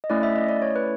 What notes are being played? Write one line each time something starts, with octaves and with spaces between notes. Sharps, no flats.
D#5
A3 C#4 E4 D5
E5
D#5
D5
C#5
B4